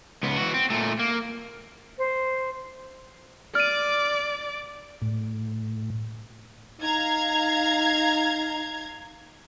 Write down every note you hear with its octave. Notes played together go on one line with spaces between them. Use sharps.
C#2 B3
E3 F#4
C4
A#2 A3
A#3
C5
D5 D6 F6 D#7
A2
D#4 F5 A#5 G#6